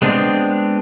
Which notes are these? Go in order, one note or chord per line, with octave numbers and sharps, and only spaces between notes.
G#3 B3 C4 D4